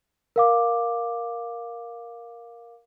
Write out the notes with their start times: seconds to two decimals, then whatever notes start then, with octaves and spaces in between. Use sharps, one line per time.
0.36 A#4 F5 D6